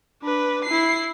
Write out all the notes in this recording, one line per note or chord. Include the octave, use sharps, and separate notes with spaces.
D4 B4
E4 C7